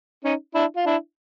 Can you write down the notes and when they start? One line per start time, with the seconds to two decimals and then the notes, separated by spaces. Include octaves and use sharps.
0.24 C#4 D#4
0.55 D4 E4
0.77 F4
0.86 D4 E4